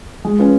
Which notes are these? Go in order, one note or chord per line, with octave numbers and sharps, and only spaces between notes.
G#3
C#4 F4 B4